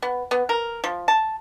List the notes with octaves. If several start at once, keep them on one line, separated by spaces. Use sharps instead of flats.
B3
B3
A#4
F3
A5